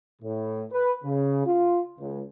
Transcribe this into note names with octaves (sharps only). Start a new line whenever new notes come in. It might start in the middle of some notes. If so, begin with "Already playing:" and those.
A2
B4
C#3
F4
C#2